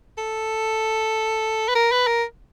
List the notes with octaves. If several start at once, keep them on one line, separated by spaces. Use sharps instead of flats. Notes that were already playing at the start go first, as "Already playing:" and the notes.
A4
B4
A#4
B4
A#4